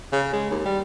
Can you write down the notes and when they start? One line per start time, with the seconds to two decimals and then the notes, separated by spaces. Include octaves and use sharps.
0.12 C#3
0.33 G#3
0.51 D#2
0.65 G3